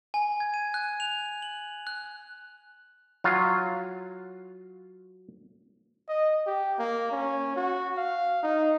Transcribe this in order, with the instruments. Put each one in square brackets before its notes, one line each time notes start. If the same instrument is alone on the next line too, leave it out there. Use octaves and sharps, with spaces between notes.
[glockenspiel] G#5
G#6
D#7
F#6
F7
F#7
F#6
[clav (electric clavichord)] F#3 F4
[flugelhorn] D#5
G4
A#3
C#4
F#4
F5
D#4